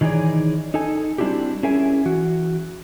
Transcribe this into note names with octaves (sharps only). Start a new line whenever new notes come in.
D#3 E3 D#4 G#4 C#5 D5
D#4 A4 G#5
G3 C4 D4 E4 F#4 G4
C#4 E4 G#4 A#4 E5 G#5
E3 F#4